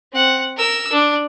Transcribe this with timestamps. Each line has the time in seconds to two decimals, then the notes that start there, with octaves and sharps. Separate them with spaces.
0.13 C4 F#5
0.57 A#4 E6
0.92 D4